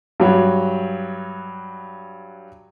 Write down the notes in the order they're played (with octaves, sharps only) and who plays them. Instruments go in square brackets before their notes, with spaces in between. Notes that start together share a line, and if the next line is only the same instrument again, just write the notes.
[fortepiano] G2 F#3